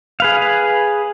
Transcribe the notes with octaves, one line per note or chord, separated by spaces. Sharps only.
G#4 B4 F5